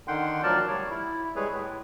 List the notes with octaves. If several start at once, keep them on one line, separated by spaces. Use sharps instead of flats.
D3 D#3 F#5 G5 C6
D2 F3 F#3 A#4 D5 A5
G3 C#5
E4
G3 G#3 G#4 B4 C#5
A2